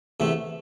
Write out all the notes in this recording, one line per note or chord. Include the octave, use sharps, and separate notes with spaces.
E2 C3 A3